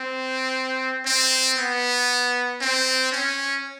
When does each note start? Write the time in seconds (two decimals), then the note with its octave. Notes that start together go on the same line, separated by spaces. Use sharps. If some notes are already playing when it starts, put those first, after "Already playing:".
Already playing: C4
1.06 C4
1.58 B3
2.61 C4
3.12 C#4